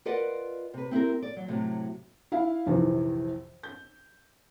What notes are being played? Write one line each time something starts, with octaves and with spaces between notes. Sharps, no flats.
F4 A#4 B4 D5 D#5 F#5
C3 B4
C4 E4 G4 A#4
D5
F#3
A2 C3 F#3
E4 F5
A#1 F2 C3 D#3 E3
G6